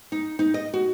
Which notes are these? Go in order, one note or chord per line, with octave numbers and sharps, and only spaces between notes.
D#4
D#4
D#5
F#4